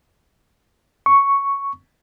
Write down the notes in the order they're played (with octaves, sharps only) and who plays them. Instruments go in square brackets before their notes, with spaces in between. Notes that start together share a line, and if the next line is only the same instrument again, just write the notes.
[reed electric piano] C#6